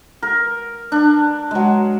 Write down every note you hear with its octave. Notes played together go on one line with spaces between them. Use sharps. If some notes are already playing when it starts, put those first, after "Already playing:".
A#4
D4
F#3 G#3